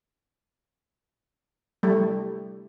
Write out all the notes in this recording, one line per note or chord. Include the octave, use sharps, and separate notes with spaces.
G3 A3